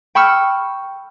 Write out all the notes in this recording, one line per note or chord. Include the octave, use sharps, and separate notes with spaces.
G5 B5 C#6 E6 F6